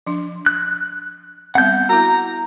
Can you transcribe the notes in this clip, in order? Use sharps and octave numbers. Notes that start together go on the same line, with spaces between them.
F3 D4
F#6
G3 B3 C4 F#5 G6
E4 F#4 A#5